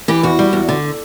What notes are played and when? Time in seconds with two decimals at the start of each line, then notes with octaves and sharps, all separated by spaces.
0.08 E3 G4
0.23 E2 F#4
0.39 G3
0.53 E2
0.69 D3